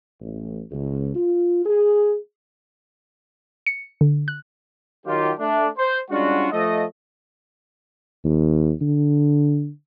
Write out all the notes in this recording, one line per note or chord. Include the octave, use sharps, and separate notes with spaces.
A1
C#2
F4
G#4
C#7
D3
F#6
D#3 F#3 F4 G4
A3 D4
C5
G3 G#3 C#4 D4 F4 F#4
F3 A3 D#5
D#2
D3